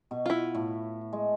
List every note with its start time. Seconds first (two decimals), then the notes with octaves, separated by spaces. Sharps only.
0.11 B2 C#6
0.26 E4 F4
0.55 A2
1.13 G#3